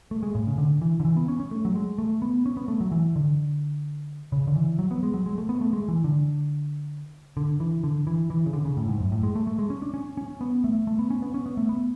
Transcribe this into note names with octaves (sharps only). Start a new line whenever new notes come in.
A3
G#3
A2
C#3
D3
E3
D3
E3
B3
C#4
C#4
A3
F#3
G#3
A3
B3
C#4
B3
A3
F#3
E3
D3
C#3
D3
E3
F#3
B3
G#3
F#3
G#3
A3
B3
A3
G#3
E3
D3
D3
E3
D3
E3
E3
C#3
D3
C#3
A2
G#2
F#2
A2
G#3
A3
A3
G#3
C#4
D4
C#4
C#4
B3
A3
A3
B3
C#4
B3
C#4
B3
A3
B3